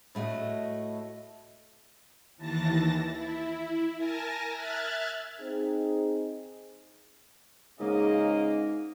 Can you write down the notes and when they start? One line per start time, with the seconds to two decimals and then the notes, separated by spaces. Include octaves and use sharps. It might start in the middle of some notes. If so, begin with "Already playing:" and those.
0.15 A2 A3 F#4 D#5
2.36 D#2 E3 A5 A6 A#6
3.10 E4
3.96 A#4 G#5 A5 A#6
4.50 E5 F6 F#6 G#6 A6
5.40 C4 D#4 G#4
7.80 G#2 C#3 A#3 D#5